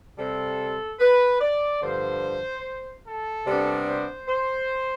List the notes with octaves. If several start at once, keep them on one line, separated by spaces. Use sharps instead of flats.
C3 G3 C4 A4
B4
D5
G2 D3 F3 C5
A4
C3 G3 B3 D4
C5
C5